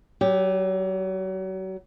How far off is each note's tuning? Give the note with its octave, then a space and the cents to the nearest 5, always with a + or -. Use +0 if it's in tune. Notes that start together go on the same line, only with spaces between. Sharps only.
F#3 +35 G4 +0